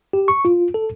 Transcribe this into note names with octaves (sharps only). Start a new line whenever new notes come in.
G4
C#6
F4
A4